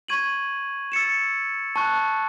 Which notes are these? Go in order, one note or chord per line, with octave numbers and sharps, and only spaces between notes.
C#6 G#6 D#7 F#7
E6 A6 C#7 E7
A5 C#6 F#6